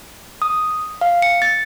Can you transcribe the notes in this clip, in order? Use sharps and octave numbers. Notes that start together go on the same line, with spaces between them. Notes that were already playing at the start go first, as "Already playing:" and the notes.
D#6
F5
C#7
A6